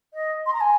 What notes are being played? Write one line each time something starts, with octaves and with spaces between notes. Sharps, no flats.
D#5
C6
A#5
G#5